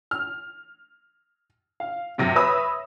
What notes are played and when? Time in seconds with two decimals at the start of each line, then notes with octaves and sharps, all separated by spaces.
0.11 F6
1.80 F5
2.18 F#2 C3 A#6
2.36 B4 C#5 E5 B5 D#6 E6